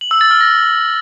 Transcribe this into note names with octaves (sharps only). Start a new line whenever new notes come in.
F#7
E6
A6
F6
A#6